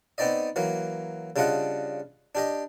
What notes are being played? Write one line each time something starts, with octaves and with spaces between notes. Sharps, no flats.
B3 C4 D#4 D5 D#5
E3 F#3 A#3
C#3 G3 D4 F4 D#5 F#5
D4 G4 D#5